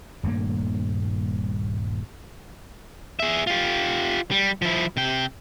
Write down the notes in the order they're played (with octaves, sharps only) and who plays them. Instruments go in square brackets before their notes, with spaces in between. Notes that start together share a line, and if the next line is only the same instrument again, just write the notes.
[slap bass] D#1 G2 A3 A#3
[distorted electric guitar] G#4 E5
F4 G4
G3
F3 E4
C3 G5